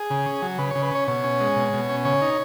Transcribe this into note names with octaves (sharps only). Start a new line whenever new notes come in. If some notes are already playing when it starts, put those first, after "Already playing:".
Already playing: G#4
C#3
C#4
F#3
C#3 B4
C#3 C#5
B4
C#4 C#5
B2 C#5
C#4
G#3
B2
B2
C#4
C#3 C#5
D#4